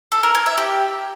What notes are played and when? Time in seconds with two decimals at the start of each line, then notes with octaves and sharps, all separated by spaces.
0.12 A4
0.23 A#4
0.35 G#5
0.46 E5
0.58 G4